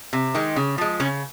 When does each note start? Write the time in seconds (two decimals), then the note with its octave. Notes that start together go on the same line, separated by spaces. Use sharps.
0.13 C3
0.34 D#3 G#3
0.56 C#3
0.78 F3 G#3
1.00 C#3 C#4